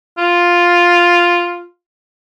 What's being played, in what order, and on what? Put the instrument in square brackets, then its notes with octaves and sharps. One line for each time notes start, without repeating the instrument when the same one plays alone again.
[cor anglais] F4